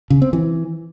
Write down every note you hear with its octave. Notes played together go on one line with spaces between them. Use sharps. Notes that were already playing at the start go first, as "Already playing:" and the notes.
C#3
C4
E3